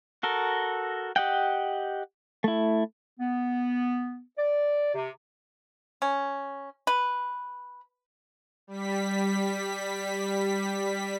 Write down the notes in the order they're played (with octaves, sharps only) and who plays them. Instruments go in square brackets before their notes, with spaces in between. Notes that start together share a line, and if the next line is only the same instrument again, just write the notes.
[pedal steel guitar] F#4 A4 A#4
G4 D#5 F#5 G5
A3 E4
[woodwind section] B3
D5
C3
[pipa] C#4
B4
[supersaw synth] G3 B6